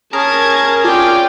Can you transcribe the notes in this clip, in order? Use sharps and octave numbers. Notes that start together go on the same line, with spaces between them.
C#4 G#4 A#4 A5 G#6
F4 D5 G5